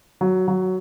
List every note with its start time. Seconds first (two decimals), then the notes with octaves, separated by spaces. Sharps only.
0.21 F#3
0.48 F#3